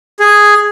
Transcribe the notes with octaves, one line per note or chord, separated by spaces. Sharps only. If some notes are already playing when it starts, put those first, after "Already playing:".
G#4